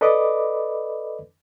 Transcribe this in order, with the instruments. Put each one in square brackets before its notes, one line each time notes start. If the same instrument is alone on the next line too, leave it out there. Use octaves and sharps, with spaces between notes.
[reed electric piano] A4 B4 D5 D#5 B5 D6